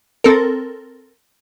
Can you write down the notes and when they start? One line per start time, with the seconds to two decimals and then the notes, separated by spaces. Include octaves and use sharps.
0.24 C4 A4 A#4